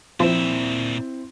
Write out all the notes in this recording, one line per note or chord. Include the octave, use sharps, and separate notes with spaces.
A#2 F3 C4 E4 E5